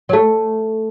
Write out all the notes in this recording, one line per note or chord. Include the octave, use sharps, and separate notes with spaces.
F#3
A3